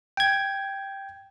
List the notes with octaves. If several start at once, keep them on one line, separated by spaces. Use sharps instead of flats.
G5 G#6